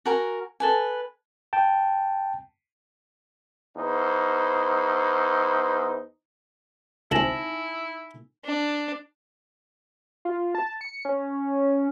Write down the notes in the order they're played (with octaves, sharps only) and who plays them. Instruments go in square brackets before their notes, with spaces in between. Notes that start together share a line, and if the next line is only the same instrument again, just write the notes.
[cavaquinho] F#4 A#4 G#5 A#5
A4 B4 G#5
[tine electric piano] G5 A5
[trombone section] E2 D#4 C5
[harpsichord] C#2 C4 [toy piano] D#4 G#5 [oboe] E4 [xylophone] A#6 E7 F#7
[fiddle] D4
[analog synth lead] F4
A5
C#7
C#4